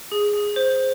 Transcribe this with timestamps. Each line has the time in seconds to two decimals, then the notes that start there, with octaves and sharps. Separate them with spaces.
0.12 G#4
0.33 G#4
0.56 C5